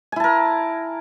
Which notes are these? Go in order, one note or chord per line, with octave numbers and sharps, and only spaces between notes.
E4 A#4 G#5 A5